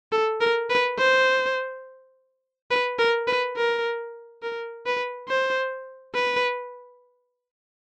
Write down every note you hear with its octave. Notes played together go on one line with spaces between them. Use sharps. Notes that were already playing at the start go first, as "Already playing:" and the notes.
A4
A#4
B4
C5
B4
A#4
B4
A#4
A#4
B4
C5
B4